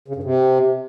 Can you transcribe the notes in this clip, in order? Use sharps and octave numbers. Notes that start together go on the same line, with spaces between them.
C#3
G2
C3